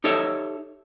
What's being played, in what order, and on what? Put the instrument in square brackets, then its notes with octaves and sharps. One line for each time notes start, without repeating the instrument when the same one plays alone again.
[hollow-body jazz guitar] D#4 G4 A4 C#5 E5